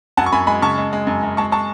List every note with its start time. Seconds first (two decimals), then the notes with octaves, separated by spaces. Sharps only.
0.17 F#2 F#5 A5
0.26 C#6
0.32 F#2 G#5 B5
0.47 G#3 G#5 B5
0.62 C#3 A5 C#6
0.78 G#3
0.93 G#3
1.07 F#2
1.23 F#2
1.37 G#3 A5 C#6
1.52 G#3 A5 C#6